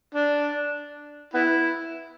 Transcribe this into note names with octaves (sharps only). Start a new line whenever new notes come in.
D4
B3 E4